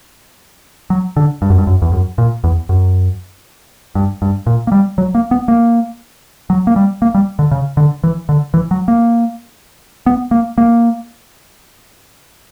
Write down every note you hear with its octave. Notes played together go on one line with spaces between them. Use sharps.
F#3
D3
G2
F#2
G2
F#2
E2
F#2
A#2
E2
F#2
G2
G2
A#2
A#3
G3
F#3
A#3
B3
A#3
F#3
A#3
G3
A#3
G3
D3
C#3
D3
E3
D3
E3
F#3
A#3
B3
A#3
A#3